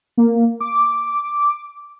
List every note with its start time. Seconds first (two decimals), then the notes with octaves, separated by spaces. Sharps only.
0.17 A#3
0.61 D6